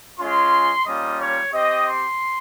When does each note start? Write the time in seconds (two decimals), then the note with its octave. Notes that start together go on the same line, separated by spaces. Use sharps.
0.18 G#3 C#4 F4 C6
0.85 G3 A#3 C#4 F4 D#5
1.19 C#5
1.52 C4 G4 D#5
1.85 C6